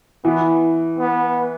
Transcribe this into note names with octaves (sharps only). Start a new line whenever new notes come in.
E3 B3
B3